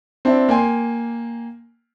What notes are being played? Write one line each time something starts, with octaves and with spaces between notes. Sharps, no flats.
C4 D4 E4
A#3 G5 G#5 C6